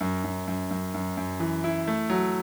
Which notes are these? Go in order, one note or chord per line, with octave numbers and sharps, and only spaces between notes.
F#2
F#2
F#2
F#2
F#2
F#2
E3
E4
A3
F#3